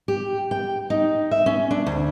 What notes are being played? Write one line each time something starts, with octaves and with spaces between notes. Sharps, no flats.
G4
G5
D#4
E5
C#4
D4
D2